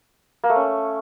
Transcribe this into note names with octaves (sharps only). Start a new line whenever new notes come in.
A#3
A3
C#4